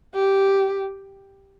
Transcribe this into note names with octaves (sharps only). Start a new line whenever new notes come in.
G4